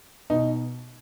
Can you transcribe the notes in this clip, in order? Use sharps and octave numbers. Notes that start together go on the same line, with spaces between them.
B2 D#4